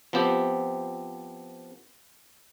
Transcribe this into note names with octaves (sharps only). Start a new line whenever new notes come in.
F3 B3 C4 G4